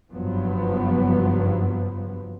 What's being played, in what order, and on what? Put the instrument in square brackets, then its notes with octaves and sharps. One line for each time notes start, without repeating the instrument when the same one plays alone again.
[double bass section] F#1 G2 F3 F#3 B3